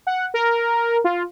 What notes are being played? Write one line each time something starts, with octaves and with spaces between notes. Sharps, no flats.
F#5
A#4
F4